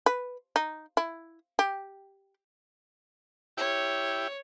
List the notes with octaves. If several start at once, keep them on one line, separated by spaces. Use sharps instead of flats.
B4
D#4
E4
G4
E4 G4 C#5